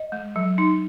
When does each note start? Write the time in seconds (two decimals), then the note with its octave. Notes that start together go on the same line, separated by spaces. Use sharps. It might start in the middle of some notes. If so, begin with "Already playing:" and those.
Already playing: D#5
0.12 G#3
0.36 F#3
0.58 D#4